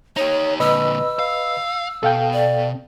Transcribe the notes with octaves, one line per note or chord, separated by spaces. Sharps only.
D#4 G4 C#5
A#2 D3 B4 D#5 B5 E6
F5
B2 A4 F5 G5
D5